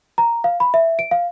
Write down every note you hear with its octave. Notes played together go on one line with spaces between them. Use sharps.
A#5
F5
B5
E5
D7
F5